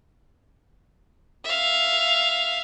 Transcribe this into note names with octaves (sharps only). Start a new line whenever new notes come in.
E5 F5